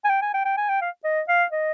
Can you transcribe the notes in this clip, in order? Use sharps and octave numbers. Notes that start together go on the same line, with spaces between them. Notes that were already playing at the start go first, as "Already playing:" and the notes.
G#5
G5
G#5
G5
G5
G#5
G5
F5
D#5
F5
D#5